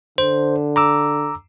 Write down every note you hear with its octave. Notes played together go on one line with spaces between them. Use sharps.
D3 C5
A#5 D6 E6